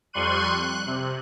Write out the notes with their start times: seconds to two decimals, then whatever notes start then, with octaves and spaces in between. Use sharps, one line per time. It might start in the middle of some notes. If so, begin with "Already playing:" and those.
0.13 F2 G3 C6 C#6 F#6 D#7
0.46 F#6
0.86 C3